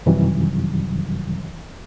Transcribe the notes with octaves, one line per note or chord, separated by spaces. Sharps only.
F#2 C3 D#3 E3 F#3 G3